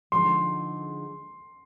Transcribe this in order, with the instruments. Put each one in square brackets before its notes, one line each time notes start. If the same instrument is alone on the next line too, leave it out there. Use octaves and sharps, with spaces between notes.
[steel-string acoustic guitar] D3 F3 G#3 D#4 G#4 [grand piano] C6